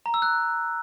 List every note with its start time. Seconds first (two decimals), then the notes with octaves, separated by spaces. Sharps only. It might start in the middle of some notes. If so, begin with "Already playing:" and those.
0.06 A#5
0.14 E6
0.22 F#6